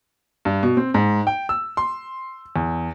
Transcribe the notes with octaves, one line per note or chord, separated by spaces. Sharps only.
G2
B2
C4
G#2
G5
E6
C6
E2